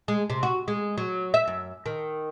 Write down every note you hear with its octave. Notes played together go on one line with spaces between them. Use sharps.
G#3
C3
F#4
G#3
F#3
E5
F#2
D#3